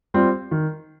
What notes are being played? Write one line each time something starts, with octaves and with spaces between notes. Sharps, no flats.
G3 C4 F4
D#3